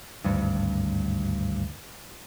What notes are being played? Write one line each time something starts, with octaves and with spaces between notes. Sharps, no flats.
G#1 D2 G2